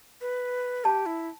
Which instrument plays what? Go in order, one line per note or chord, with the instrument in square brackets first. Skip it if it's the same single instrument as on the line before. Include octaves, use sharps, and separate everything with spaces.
[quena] B4
[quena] G4 [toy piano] A5
[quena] E4